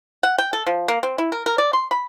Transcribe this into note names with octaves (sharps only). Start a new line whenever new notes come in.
F#5
G5
A4
F3
A#3
C4
E4
A#4
A#4
D5
C6
B5